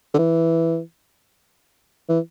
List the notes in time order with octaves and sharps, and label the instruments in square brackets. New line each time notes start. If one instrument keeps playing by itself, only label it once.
[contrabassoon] D3
E3
E3